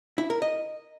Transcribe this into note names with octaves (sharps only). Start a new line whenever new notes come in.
E4
A#4
D#5